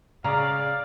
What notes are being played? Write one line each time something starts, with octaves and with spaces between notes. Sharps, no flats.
C#3 D5 F5 A#5